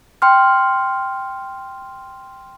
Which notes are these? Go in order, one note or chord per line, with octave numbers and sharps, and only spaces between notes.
G5 C6 F6